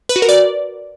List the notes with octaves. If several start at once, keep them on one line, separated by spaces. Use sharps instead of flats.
B4
F#4
A#4
D5